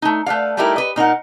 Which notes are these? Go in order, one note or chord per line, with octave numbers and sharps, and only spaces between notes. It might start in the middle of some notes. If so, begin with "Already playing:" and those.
A3 D#4
A3 B4 D5 F5
G3 A3 D#4 E4 G4 A#4
B4 D#5
A#2 D#4 A#4 F#5